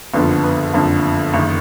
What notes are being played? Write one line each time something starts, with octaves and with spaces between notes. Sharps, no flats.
F#1 F2 D3 F3 B3
B3
F#1 F2 D3 F3
F#1 D#3